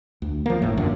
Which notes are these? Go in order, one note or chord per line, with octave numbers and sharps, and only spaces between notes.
D2
F3 A#3
G1 A2
F#2 A#2 D3